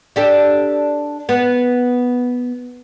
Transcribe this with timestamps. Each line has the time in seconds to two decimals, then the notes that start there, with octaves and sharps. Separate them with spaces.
0.16 D4 G4 A4
1.29 B3